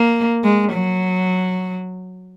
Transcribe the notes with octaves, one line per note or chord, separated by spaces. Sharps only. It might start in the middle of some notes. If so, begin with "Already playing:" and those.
Already playing: A#3
G#3
F#3